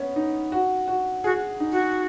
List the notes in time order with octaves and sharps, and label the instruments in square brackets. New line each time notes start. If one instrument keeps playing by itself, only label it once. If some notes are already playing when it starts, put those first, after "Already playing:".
Already playing: [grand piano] B3 C#4
D#4
F#4
F#4
[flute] F#4 [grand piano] G#4
[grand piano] D#4
[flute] F#4